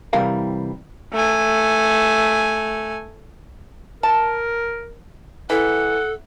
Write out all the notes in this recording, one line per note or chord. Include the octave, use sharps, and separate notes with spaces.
C2 C3 E3 G3 A#4 F5
A3 G#5
A#4 A5
E3 A4 F#5